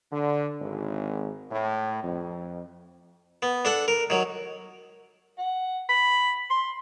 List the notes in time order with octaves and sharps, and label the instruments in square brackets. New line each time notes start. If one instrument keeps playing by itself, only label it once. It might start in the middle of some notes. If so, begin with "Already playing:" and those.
[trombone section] D3
G#1
A2
F2
[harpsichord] B3
D4 A4 F#5
A#4
D#3 F#3
[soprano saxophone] F#5
B5
C6